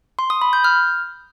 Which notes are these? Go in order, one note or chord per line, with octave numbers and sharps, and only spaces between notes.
C6
D#6
B5
G6
F6